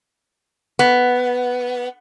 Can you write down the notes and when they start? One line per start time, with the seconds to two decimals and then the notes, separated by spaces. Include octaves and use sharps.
0.79 B3